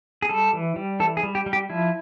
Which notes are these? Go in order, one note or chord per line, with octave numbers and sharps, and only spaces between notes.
G#4
G3 A4
E3
G3
E3 A4
G#4
G3
G4
G3
G4
F3 E4